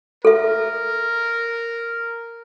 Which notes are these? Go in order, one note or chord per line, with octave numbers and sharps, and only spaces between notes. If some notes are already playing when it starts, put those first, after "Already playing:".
A4 A#4 E5